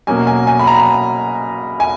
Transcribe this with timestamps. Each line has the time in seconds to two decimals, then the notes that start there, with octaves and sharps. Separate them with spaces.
0.07 B2 F#3 A#3 C#4 G#5
0.27 G#5
0.47 G#5
0.59 B5
0.67 A#5
1.80 G#5